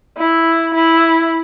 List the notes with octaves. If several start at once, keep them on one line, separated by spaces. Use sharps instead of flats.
E4
E4